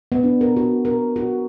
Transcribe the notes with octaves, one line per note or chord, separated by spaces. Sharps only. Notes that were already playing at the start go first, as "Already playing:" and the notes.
B3
D4
A#4
F#4
A#4
F#4